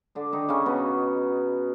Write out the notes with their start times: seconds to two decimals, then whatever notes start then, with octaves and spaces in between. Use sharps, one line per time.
0.15 D3 D4
0.32 D#3 D#4
0.49 C#3 C#4
0.66 B2 B3